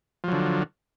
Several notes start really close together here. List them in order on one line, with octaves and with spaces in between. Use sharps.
F3 F#3 D3